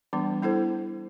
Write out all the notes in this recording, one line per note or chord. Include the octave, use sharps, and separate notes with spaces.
E3 G3 B3 D4
B3 E4 A4 C5